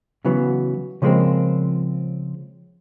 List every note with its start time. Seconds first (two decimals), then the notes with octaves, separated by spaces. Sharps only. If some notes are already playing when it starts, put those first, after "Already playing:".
0.25 C#3 E3 F#3 B3
1.02 C#3 F3 G3 G#3 A#3 C4